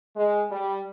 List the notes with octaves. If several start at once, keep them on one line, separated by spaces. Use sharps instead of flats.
G#3
G3